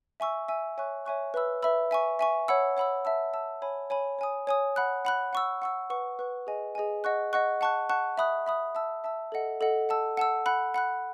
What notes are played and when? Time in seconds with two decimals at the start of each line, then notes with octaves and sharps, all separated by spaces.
0.20 E5 G#5 C#6 E6
0.48 E5 G#5 C#6 E6
0.78 C#5 E5 G#5 C#6 F#6
1.06 C#5 E5 G#5 C#6 F#6
1.34 B4 E5 B5 E6
1.63 B4 E5 B5 E6
1.91 E5 G#5 C#6
2.19 E5 G#5 C#6
2.48 C#5 F#5 B5 E6
2.77 C#5 F#5 B5 E6
3.05 E5 A5 E6
3.33 E5 A5 E6
3.62 C#5 G#5 B5
3.90 C#5 G#5 B5
4.19 C#5 G#5 D#6
4.47 C#5 G#5 D#6
4.76 F#5 B5 F#6
5.05 F#5 B5 F#6
5.33 F#5 C#6 E6
5.62 F#5 C#6 E6
5.90 B4 F#5 C#6
6.19 B4 F#5 C#6
6.47 G#4 D#5 G#5
6.75 G#4 D#5 G#5
7.04 D#5 F#5 C#6 F#6
7.33 D#5 F#5 C#6 F#6
7.61 F#5 A5 C#6 F#6
7.89 F#5 A5 C#6 F#6
8.18 E5 B5 D#6 F#6
8.46 E5 B5 D#6 F#6
8.75 E5 A5 E6
9.04 E5 A5 E6
9.32 A4 D#5 F#5
9.61 A4 D#5 F#5
9.89 F#5 A5 E6
10.17 F#5 A5 E6
10.46 F#5 B5 F#6
10.74 F#5 B5 F#6